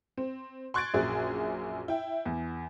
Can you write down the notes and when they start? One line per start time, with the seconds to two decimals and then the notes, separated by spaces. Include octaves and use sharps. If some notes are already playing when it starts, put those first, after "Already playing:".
0.18 C4
0.74 C6 C#6 F#6 G#6 A6 D7
0.94 A#1 F#2 G#4
1.88 E4 G5
2.26 E2